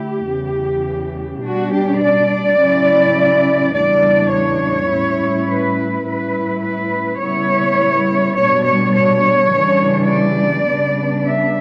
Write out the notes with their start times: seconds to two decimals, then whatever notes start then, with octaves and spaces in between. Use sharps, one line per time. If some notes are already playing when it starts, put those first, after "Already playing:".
Already playing: D3 A3 E4 G4
0.26 E2 C#3 E3 G3
1.42 B2 G3 D4 F#4
1.72 G4
2.00 D5
2.58 C#3 F#3 C#4 E4
3.73 E2 C#3 E3 G3 D4 D5
4.32 C#5
4.89 A2 G3 C#4 E4
5.47 B4
6.04 A2 G3 C#4 E4 B4
6.62 B4
7.20 C#3 G3 B3 E4 C#5
8.35 B2 G3 D4 C#5
8.65 C#5
8.93 C#5
9.52 C#3 E3 G3 D4
10.09 D5
10.66 C#3 G3 B3 D4
11.25 E5